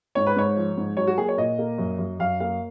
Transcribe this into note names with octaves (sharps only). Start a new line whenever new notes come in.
G#2 C#5
B4
G#2 C#5
F3
G#2
F#3 C#5
F#4
A#3 G#4
C#5
A#2 D#5
A#3
F#2
F#2
F#2 F5
A#3 F5